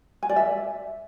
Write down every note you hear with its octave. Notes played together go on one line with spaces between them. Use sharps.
G#5
D5
E5